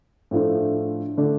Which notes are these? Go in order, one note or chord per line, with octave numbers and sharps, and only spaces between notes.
A2 F3 A3 D4
D3 A3 D4